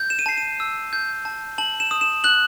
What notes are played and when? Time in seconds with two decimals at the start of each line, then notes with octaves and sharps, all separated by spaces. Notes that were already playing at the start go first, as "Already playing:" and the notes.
Already playing: G6
0.10 E7
0.19 D#7
0.26 A5 C7
0.38 D#7
0.60 E6
0.93 G6
1.25 A5
1.58 A5 F#7
1.80 E7
1.91 D#6
2.01 E7
2.24 F#6 F#7